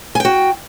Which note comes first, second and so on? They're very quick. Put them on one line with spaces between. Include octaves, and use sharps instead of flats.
G#5 G5 F#4